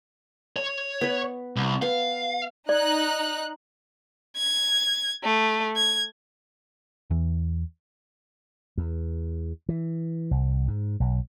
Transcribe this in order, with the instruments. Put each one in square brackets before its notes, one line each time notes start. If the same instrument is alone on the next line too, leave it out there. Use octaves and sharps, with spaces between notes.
[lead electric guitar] C#5
[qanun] B3 B4
[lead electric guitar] C2
[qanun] B3 [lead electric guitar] F5
[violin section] D#4 F#6 [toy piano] D5
[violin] G#6
A3
G#6
[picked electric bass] E2 E3
[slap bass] E2
E3
C2
G#2
B1